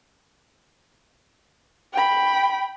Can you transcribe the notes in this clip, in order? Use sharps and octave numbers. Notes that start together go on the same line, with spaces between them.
G5 B5